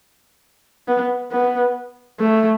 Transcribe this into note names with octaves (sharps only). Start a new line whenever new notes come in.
B3
B3
A3